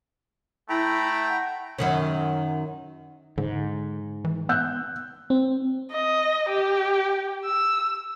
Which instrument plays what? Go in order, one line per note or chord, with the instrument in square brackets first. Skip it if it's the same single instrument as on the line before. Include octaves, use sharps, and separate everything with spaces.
[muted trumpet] A3 [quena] E4 [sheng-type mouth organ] G5 A#5 B5
[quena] F#5
[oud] F#2 D#3 C#4
[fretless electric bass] G#2 [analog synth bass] D3
[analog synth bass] E3
[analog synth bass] B3 [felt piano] E6 F#6 G6
[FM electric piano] C4
[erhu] D#5
G4
E6